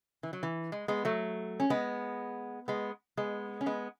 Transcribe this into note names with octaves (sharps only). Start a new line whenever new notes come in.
E3
F#3
E3
G#3
G#3 B3
F#3 A3
C#4
G#3 B3
G#3 B3
G#3 B3
C#4
G#3 B3